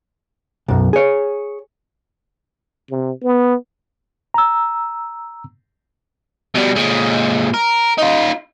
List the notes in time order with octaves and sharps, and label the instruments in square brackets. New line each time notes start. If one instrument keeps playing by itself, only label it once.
[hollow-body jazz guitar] B1 F#2
G#4 C#5
[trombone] C3
B3
[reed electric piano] A#5 E6
[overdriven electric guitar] B2 G3
A#2 G#3
A#4
D#4 F4